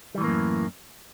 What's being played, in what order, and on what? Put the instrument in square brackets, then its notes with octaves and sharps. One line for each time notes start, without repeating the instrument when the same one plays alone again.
[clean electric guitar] G3
E3
A2
A#3
F#2